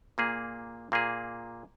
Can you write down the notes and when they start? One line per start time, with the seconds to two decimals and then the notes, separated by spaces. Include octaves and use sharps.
0.18 A#2 A#3 G#4
0.92 A#2 A#3 G#4